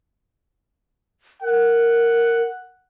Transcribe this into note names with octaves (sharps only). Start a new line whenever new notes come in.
A#4 F#5